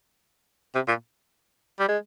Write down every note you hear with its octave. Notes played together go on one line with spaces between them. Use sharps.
C3
A#2
G3
G#3